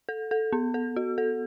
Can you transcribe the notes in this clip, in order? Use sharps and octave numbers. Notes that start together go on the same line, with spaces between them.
A4
A4
B3
A4
F#4
A4